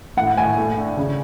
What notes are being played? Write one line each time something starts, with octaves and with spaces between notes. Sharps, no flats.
A2 F#5
A2 G#5
A3
D4
C#3